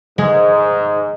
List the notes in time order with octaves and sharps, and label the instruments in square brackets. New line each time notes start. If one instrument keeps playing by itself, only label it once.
[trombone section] G#2 [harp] G#3